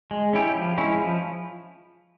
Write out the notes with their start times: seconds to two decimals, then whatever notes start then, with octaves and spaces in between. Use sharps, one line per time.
0.11 G#3
0.33 C#4 E4 G4
0.55 F3
0.78 G#3 C#4 E4
0.99 F3